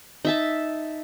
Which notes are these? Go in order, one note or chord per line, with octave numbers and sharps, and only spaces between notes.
D#4 E5 A5